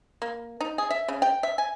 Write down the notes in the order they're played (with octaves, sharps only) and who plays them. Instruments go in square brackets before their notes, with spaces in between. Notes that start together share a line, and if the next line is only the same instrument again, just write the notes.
[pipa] A#3
D#4
G#4
E5
C#3
G5
E5
G#5